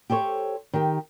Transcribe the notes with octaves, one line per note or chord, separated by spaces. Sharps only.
G4 A4 C5 C#5
D#3 G4